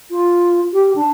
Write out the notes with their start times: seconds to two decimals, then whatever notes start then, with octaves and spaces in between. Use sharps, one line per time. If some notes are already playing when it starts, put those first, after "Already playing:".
0.11 F4
0.73 G4
0.96 D4